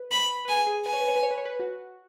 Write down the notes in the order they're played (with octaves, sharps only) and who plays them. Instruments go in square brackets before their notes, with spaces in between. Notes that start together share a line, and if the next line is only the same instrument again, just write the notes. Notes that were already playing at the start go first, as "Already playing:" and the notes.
Already playing: [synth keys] B4
[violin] B5
[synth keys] B4
[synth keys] G#4 [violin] G#5
[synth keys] G#4
[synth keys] B4 [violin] G#5
[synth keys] C#5
B4
C#5
B4
C#5
B4
C#5
B4
F#4